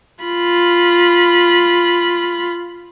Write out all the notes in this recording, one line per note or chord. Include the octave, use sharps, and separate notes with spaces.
F4 B5